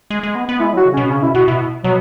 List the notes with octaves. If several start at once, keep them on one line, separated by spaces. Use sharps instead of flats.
G#3
G#3
B3
B3
G#3 E4
F#3 F#4
C#3
C#4
B2
C#3 C#4
B2 E4
B2 F#4
B2 E4
B2 F#3